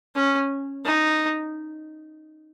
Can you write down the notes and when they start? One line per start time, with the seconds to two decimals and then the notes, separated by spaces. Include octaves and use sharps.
0.15 C#4
0.85 D#4